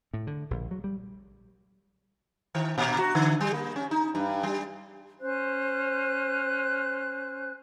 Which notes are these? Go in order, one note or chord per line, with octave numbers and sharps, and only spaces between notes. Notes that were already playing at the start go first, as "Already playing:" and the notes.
A2
D3
A#1
F#3
G3
D#3
A#2
F#4
D3
G3
A#3
C#4
D#4
G2
G3
C#4 C5 F#6